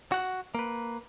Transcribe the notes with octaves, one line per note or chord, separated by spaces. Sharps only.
F#4 F#5
A#3 B4